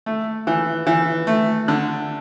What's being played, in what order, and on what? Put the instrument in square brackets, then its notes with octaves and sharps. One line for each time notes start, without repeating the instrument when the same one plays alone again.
[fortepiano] A3
E3
E3
A3
D3